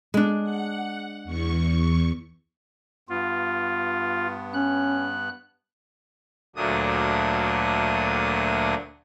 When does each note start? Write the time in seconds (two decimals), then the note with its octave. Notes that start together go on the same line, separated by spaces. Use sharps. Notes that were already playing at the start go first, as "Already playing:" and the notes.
0.14 G#3 D4
0.43 F#5
1.24 E2 C#6
3.09 G2 B3 F4
4.54 C#4 F#6
6.56 D2 A#2 F#3 A3 D4 D#6